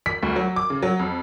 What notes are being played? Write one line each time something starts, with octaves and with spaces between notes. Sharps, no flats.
B6
D2
F#3
D6
C#3
F#3
F2